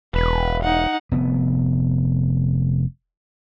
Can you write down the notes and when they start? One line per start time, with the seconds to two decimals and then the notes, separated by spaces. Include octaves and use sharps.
0.14 E1 B4
0.64 D#4 F#5
1.12 F1 B3